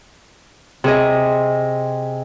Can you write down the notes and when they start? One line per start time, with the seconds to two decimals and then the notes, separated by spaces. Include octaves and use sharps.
0.84 C3 G#4 D#5